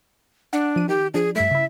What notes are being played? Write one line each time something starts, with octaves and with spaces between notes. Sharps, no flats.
D4 F#5
F3 D#7
D#3 G4
F3 D4 G#4
G2 G3 A3 E5
C#3 E4